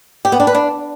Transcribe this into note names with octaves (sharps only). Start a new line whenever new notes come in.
G4
B3
D4
B4
D4